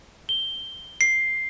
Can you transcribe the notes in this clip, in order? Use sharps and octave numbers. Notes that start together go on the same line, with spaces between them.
G7
C7